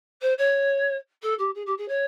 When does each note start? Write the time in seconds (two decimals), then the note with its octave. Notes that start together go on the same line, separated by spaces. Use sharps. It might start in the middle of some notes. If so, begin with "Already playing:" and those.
0.21 C5
0.38 C#5
1.22 A4
1.38 G4
1.54 G#4
1.66 G4
1.77 G#4
1.88 C#5